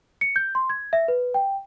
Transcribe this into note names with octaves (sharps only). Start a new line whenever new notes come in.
C#7
G6
C6
G#6
E5
B4
G5